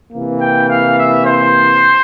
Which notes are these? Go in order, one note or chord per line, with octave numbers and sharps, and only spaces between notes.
C3 E3 A#3
G5
F5
E5
C5